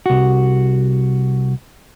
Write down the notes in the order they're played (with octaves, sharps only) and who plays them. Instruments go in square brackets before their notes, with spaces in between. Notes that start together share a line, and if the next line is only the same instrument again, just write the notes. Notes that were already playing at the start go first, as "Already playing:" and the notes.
[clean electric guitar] C2 F#4